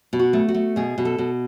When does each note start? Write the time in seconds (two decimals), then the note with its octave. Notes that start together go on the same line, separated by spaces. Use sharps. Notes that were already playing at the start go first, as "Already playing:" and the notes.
0.13 B2
0.19 F#4
0.33 A3
0.48 F#4
0.55 A3
0.76 B2 G#4
0.98 B2
1.05 A4
1.18 B2